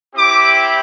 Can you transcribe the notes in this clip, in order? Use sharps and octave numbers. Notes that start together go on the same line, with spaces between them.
C4 E4 G4 D6